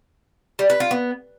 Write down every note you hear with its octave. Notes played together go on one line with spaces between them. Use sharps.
G3
B4
F4
B3